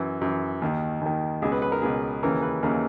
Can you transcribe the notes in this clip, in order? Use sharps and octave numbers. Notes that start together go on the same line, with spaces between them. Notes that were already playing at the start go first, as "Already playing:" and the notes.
Already playing: F#2 E3
F#2 E3
D#2 D#3
D#2 D#3
C#2 B2 G#4
B4
B4
A#4
C#2 B2 G#4
D#2 C#3 E3 A#4
B4
D#2 C#3 E3 A#4